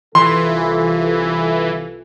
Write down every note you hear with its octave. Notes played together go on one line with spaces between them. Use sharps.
C2 E3 F4 A4 C6